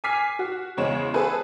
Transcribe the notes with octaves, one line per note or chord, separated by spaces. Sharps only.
G#5 D6 F6 B6 C7
F#4
E2 C#3 G#3 C#5 E7
G#4 A4 B4 C5